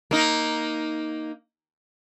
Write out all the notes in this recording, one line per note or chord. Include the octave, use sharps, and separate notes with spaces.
A#3 D#4